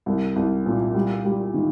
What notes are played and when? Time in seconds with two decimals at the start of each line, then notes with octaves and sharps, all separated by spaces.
0.06 C2
0.36 C2
0.66 A#2
0.94 G3
1.25 G3
1.54 D#3